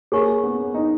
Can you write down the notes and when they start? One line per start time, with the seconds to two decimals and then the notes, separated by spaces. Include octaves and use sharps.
0.12 A#3 G#4 C#5 G#5 C#6
0.43 B3
0.75 D#4